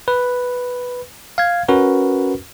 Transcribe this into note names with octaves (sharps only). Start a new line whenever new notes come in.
B4
F5 G#6
C#4 F#4 A#4 B4